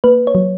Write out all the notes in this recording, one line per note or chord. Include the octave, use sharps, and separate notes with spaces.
A#3 B4
C#5
F#3